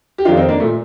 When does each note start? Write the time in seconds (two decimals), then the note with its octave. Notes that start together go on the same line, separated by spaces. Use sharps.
0.18 G4
0.25 F2 D#3 D4 F4
0.37 C4 D#4
0.49 A#3 D4
0.60 A3
0.63 A#2